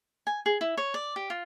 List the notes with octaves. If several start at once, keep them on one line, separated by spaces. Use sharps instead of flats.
G#5
G#4
E4
C#5
D5
G4
F4